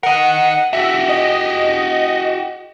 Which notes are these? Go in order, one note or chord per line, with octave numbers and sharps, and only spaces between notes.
A#4 D#5 F#5
F#4 G4 E5
D#5